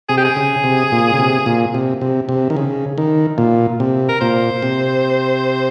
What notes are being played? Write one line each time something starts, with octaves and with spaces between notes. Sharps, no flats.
C3 G#4
G4
G#4
C#3
C3
A#2
C#3
C3
A#2
C3
C3
C3
D#3
C#3
D#3
A#2
C3
A#4
A#2 C5
C3